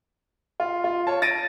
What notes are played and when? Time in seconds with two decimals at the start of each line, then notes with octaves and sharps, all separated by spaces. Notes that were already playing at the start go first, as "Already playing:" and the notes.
0.60 F4
0.84 F4
1.07 C#5 A5
1.22 A6 A#6 D7 D#7